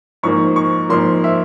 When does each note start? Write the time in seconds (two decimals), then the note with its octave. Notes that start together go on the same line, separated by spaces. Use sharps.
0.23 G#2 F3 A#3 C#6
0.56 C#6
0.90 G#2 F3 A#3 C6
1.24 E5